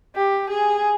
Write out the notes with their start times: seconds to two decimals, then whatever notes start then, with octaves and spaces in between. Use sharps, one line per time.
0.16 G4
0.50 G#4